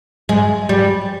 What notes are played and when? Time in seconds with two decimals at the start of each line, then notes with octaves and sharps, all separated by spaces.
0.29 G#3
0.69 G3